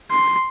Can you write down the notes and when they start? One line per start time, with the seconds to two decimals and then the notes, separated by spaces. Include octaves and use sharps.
0.11 C6